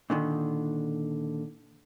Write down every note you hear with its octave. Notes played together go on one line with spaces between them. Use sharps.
A#2 D3 D#3